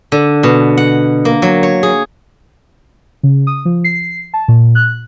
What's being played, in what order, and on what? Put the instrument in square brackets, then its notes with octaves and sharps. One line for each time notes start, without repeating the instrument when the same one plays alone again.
[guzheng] D3
B2
F#5
A#3
F#3
C#5
G#4
[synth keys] C#3
D#6
F3
C7
A5
A#2
F#6